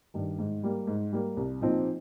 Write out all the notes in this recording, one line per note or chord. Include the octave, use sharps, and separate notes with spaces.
G2 D#3
G#2
G3 A#3
G#2
G3 A#3
C2
A#2 F3 C4 D#4